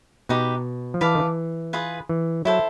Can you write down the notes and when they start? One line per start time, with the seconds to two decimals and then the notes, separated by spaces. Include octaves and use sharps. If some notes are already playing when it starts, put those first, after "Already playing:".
0.29 B2 D#4 G4 B4
0.94 F3
1.01 E3 B4 D5 F5 A5
1.15 D#3
1.19 E3
1.73 F4 G#4 B4
2.09 E3
2.45 F#3 E4 A4 C5